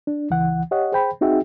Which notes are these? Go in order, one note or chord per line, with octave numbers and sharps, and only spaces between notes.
D4
C#2 E3 F#5
G4 C#5 D#5 F#5
G#4 C5 G5 B5
C4 D#4 F#4 G#4 E5 G5